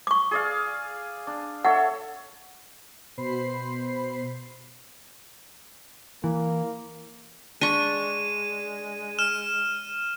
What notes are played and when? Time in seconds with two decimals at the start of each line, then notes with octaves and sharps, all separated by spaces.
0.07 C#6 D6
0.31 G#4 D5 F5
1.27 D4
1.65 A4 C#5 E5 F#5
3.18 B2 C5 B5 C7
6.24 E3 A#3
7.61 G#3 D4 C#6 D#7
9.19 F6 E7